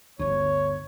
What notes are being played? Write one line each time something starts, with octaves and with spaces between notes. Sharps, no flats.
G1 D2 C#5